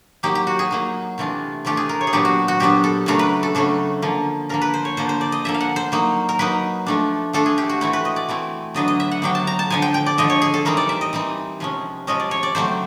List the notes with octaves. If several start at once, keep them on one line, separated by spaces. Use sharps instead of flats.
F#3 A#3 D#4 G4
G4
F#4
G#4
F#3 A#3 D#4
C3 E3 A3 D4 F4
C3 E3 A3 D4 F4 G4
G#4
A#4
C#5
G#4
A#2 F#3 B3 D4 G4
F#4
F#4
A#2 F#3 B3 D4 G4
A4
C#3 F#3 A3 D4 A#4
B4
A4
C#3 F#3 A3 D4 A4
D3 F3 A#3
D3 F3 A#3 A#4
B4
C5
C#5
D3 F3 A#3 C5
C5
D5
D#5
D3 F3 A#3 E5
F5
F#5
C5
F#3 A#3 D#4
A#4
F#3 A#3 D#4 B4
F3 A3 D4
F3 A3 D4 A4
G#4
G4
F#4
E3 A3 C4 E4 F#4
B4
D#5
D5
E3 A3 C4 E4
D3 F#3 B3 D4 D#5
D#5
E5
F#5
D3 F#3 B3 D4 G5
A5
A#5
A5
D3 F3 G#3 G#5
G5
G5
D5
D3 F3 G#3 D#5
C#5
G#4
A4
E3 G3 C4 D#4 A#4
D5
E5
D#5
E3 G3 C4 D#4
C3 F3 G#3 C#4
C3 F3 G#3 C#4 D#5
D5
C#5
D5
C#3 F#3 A3 C4 C5